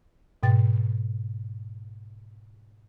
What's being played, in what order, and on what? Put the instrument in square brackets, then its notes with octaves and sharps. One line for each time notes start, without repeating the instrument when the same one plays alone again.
[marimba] G#2 B2 G5 A6